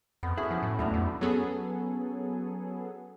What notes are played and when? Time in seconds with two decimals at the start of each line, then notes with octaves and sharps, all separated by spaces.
0.23 F2 B3
0.37 C#4 E4 F#4 G#4 A4
0.51 F3
0.63 A2
0.79 D#2 A2 F#3 A3 B3 D4 E4
0.94 F2
1.21 F#3 B3 C#4 G#4 A4